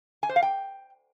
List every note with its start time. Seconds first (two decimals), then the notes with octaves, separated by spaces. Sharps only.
0.23 G#5
0.29 C5
0.36 F5
0.43 G5